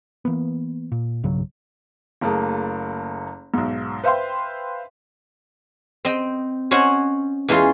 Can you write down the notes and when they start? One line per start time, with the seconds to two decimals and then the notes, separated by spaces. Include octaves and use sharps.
0.25 E3 A#3 B3
0.92 A#2
1.23 B1 G2 C#3 F#3
2.21 F#1 A3 A#3 G#4
3.54 B1 G#2
4.04 B4 C5 E5 F5 G5 C6
6.05 C4 D#5 G5
6.71 C#4 C5 C#5 D#5 F#5 G#5
7.49 E2 E3 G#3 C#4 F4 C6